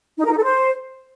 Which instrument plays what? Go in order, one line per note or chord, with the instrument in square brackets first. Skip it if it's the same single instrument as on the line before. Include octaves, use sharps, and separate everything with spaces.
[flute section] D#4
A#4
D#4
A4
C5